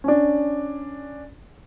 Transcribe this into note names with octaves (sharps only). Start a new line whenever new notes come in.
C#4 D4